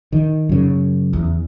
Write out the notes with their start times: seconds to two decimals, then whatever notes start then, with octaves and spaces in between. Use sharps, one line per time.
0.12 D#3
0.49 F#2 C#3
1.13 E2